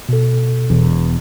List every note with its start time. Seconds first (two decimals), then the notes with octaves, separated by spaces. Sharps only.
0.09 B2 A4
0.70 E1 E2